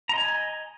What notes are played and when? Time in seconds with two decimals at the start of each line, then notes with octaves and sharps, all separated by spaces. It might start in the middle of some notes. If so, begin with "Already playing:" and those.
0.09 A#5
0.13 D#5
0.17 G#5